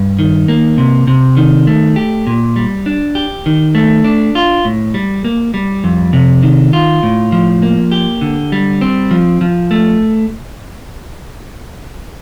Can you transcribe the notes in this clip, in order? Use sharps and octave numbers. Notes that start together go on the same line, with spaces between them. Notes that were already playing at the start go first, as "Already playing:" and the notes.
Already playing: G2
D#3
A#3
C3
C3
D#3
A3
G4
A#2
G3
D4
G4
D#3
A3
D4
F4
A2
G3
A#3
G3
F2
C3
D#3
F4
A2
F3
A#3
G4
D3
G3
C4
F3
F3
A3